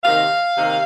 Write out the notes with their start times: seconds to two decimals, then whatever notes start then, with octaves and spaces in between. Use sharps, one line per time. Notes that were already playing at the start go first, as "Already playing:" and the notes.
0.03 C3 D#3 A#3 F5
0.57 C3 D#3 A#3